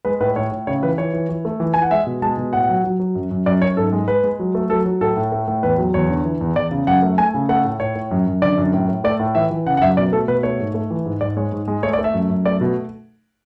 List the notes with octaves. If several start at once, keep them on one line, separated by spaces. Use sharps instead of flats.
G#3 B4
A2 B4
A2 C#5
A2
C#3 C#5
E3 B4
E3 C#5
E3
E3
A3
E3
E3 G#5
F#5
G#3 E5
B2
G#3 A5
B2
A2 F#5
F#3
F#3
F#3
F#2
F#2
F#2 D5
F#2 C#5
G#2 A4
G#3
G#3 B4
G#3
F#3
A3
F#3 A4
F#3
A2 A4
A2
A3
A2
E2 B4
F#3
E2 C#5
D3
E3
E2
E2 D5
C#3
F#2 F#5
A3
A3 G#5
C#3
A3 F#5
A2
A2 C#5
A2
F#2
F#2
D3 D5
F#2
A2
A2
A3 D5
A2
E3 E5
E3
C#3 F#5
F#5
F#2 E5
B2 D5
A3 A4
B2 B4
A3 C#5
G#2
A3
E3
G#2
G#2 D5
G#3 C#5
G#2
G#3
A3 C#5
D5
A3
E5
F#2
F#2
A3 D5
B2